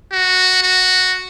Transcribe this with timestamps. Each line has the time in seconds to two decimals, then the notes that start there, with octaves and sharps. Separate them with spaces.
0.12 F#4
0.63 F#4